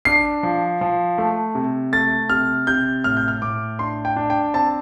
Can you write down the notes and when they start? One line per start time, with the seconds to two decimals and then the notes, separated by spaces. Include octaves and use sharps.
0.05 D4 C7
0.43 F3
0.81 F3
1.18 A3
1.55 C3
1.92 A3 A6
2.30 C3 F6
2.67 C3 G6
3.04 A2 F6
3.17 G6
3.28 F6
3.42 A2 D6
3.79 D4 C6
4.05 G5
4.16 D4
4.30 G5
4.54 C4 A5